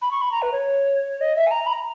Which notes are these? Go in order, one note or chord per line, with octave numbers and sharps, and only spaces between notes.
B5
C#6
B5
A#5
B4
C#5
D#5
E5
G#5
A#5
B5
A#5